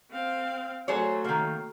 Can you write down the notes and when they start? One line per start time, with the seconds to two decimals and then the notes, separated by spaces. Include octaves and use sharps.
0.11 C4 F5
0.88 F#3 A3 G#4 C5 C#5
1.24 D#3 A#3